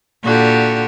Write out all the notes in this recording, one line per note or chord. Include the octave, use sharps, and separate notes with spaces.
A#2 D3 F#4 G4